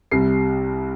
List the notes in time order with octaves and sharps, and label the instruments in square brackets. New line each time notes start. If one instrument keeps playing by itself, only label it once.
[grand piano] C2 C3 G3 C7